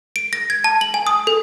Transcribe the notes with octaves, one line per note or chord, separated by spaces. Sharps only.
D7
A#6
G#6
A5
F#7
G#5
D#6
A4